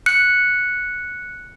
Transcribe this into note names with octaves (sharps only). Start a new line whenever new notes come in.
F#6 C#7